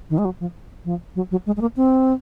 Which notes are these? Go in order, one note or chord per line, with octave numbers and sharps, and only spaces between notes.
D#3
G#3
F#3
F3
F3
F#3
F#3
G#3
G#3
A#3
C4